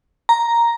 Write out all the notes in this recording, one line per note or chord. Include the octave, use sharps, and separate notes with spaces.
A#5